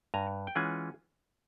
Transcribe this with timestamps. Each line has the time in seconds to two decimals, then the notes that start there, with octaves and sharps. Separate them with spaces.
0.14 G2 G#5 A#5
0.47 G5
0.55 E3 G#3 C#4 F4 F#5 G#5